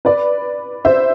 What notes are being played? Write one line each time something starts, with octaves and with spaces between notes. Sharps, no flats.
B4 D5
C5 E5